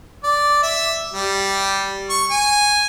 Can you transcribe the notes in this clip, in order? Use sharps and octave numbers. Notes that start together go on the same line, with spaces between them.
D5
E5
G3
C#6
G#5